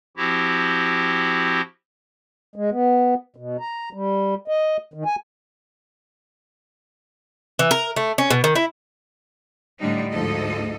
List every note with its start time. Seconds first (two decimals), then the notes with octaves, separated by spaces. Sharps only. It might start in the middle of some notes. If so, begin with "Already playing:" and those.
0.17 F3 C4 E4 F#4 G4
2.56 G#3
2.72 B3
3.36 B2
3.60 A#5
3.93 G3
4.48 D#5
4.94 D#3
5.06 G#5
7.59 E3
7.71 A#4
7.96 A3
8.18 C#4
8.30 B2
8.44 D#3
8.56 E4
9.79 A2 D3 G3 D4 D#4
10.12 D2 G#2 F3 D#4 A4 D#5